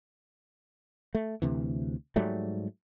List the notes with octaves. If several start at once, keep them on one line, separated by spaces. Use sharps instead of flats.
A3
D2 C3 E3
G#2 F#3 G3 A3